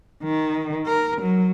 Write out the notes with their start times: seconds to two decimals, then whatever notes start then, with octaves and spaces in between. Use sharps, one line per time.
0.23 D#3
0.86 A#4
1.22 F#3